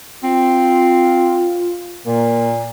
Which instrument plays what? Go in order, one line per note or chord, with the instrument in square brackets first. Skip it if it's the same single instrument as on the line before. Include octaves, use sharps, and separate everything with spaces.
[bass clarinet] C4 [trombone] F4
[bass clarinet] A#2 [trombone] A#3